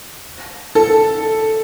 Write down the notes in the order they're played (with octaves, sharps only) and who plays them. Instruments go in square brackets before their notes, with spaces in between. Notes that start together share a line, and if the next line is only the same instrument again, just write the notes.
[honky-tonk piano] A4